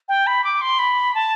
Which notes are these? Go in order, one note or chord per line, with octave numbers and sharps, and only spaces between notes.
G5
B5
D6
C6
B5
A5